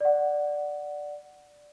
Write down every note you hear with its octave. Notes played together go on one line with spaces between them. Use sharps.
D5 F#5